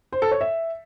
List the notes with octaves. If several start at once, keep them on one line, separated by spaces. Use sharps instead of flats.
C5
A4
C#5
E5